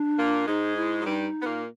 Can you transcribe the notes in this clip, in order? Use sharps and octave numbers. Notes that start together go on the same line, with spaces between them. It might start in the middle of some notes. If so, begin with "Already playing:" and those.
Already playing: D4
A#2 A#3
G#2 G#3 D#4
E4
F#3
G2 G3 D#4
B3
A#2 A#3